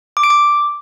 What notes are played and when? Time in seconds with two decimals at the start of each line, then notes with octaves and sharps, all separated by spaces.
0.17 D6
0.23 D7
0.30 D6